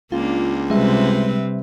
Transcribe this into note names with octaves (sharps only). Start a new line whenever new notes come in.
C#2 A#3 D4 F4
C3 G3 G#3 C4 B4 E5